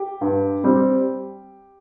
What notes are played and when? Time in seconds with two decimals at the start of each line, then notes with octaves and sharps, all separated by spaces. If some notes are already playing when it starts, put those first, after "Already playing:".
Already playing: G4
0.21 G2
0.64 G3 C4